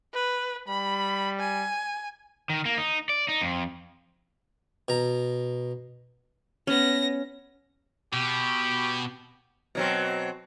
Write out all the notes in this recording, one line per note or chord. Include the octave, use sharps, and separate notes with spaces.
B4
G3 B5
G#5
D#3
A#3
D#4
D5
D#4
F2
B2 A#5
B3 C#4 A#6
B2 G4
B2 F#3 C4